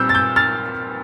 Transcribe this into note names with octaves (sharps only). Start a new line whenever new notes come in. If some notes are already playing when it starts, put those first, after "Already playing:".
Already playing: A#2 G3 C4 E6 G6
A6
E6 G6
F6 A6